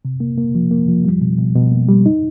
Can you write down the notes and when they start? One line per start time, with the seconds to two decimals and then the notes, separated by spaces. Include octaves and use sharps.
0.05 C3
0.20 A#3
0.37 A#3
0.55 F3
0.71 A#3
0.88 F3
1.05 G3
1.21 B2
1.38 B2
1.55 B2
1.72 A#3
1.88 G3
2.06 D#4